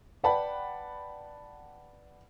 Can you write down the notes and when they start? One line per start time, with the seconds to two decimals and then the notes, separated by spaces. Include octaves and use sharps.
0.24 B4 D5 F#5 G5 A5 B5